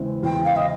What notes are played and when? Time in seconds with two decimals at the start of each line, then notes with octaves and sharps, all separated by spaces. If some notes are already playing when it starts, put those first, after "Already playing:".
Already playing: E2 C#3 E3 G#3 C4
0.23 E2 G5
0.44 F5
0.56 D#5